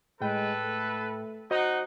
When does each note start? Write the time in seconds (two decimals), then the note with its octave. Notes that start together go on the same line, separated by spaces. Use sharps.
0.21 A2 G#3 A4 B4 G5
0.62 A3
1.51 D#4 F#4 C5 D#5 F#5